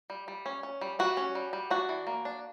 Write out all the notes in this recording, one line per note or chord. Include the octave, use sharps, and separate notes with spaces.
G3
G3
C#4
C#4
G3
G3 F#4
C#4
G3
G3
D4 F#4
E3
A#3
D4